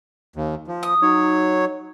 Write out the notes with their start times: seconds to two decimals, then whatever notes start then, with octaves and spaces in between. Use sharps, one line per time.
0.36 D#2
0.67 F3
0.83 D#6
1.02 F#3 D#4 C#5